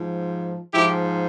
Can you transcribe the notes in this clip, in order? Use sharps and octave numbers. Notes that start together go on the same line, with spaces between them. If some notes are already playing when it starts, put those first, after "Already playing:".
Already playing: G#2 F3
G#2 F3 E4 G4